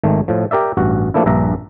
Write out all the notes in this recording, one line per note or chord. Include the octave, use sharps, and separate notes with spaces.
G#1 D#3 A3
A2 F3
G4 A#4 D5 E5
A1 G2 F#4
F3 A3 A#3 D4 E4
A#1 G2 E5 A#5